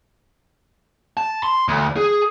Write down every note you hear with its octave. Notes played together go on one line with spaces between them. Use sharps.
A5
C6
D2
G#4